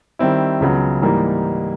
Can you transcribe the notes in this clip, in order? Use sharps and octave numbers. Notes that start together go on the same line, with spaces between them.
D#3 G3 C4 E4
C#2 C#3 F#3 B3
G#2 E3 G3 A#3 D#4